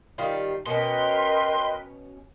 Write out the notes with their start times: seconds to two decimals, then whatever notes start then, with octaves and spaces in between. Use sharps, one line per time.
0.18 D#3 G3 F4
0.66 B2 C#4 A#4 B4 D#5 G5 C6